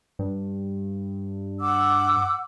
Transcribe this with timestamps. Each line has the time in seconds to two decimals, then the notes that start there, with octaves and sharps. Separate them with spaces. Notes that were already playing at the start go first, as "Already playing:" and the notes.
0.19 G2
1.60 F#5 D6 E6